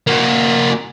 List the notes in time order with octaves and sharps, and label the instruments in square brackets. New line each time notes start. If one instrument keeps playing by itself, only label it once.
[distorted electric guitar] A#3 F#4